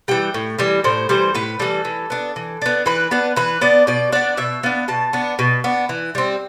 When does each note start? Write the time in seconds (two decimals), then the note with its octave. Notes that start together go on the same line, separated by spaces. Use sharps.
0.08 E3 G3 G5
0.34 A2
0.58 E3 G3
0.84 A2 C5
1.09 E3 G3 C5
1.34 A2 B4
1.59 E3 G3 A4
1.85 E3
2.10 B3 D4
2.36 E3
2.62 B3 D4
2.86 E3 B4
3.11 B3 D4 B4
3.36 E3 B4
3.61 B3 D4 D5
3.87 B2 D5
4.12 B3 D4 D5
4.37 B2 E5
4.63 B3 D4 F5
4.88 B2 A5
5.13 B3 D4
5.39 B2
5.64 B3 D4
5.89 E3
6.15 G3 C4